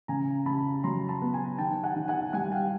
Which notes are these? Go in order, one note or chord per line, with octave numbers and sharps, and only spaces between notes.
C#3 G#5 A#5
C#3 A5 B5
F#3 A#5 C6
A5 B5
B3
G#5 A#5
D#3 G5 A5
F#5 G#5
D#3
F#5 G#5
G3 F#5 G#5
F5 G5